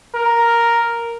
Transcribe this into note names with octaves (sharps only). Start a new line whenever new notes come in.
A#4